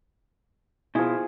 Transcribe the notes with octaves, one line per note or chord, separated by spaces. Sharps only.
B2 F3 E4 G#4